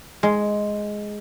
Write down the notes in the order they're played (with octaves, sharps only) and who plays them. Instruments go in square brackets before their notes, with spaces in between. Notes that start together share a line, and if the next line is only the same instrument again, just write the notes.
[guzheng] G#3